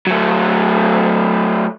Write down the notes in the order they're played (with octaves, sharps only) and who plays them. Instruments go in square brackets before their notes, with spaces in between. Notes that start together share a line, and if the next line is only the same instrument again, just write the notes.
[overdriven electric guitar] F#3 A3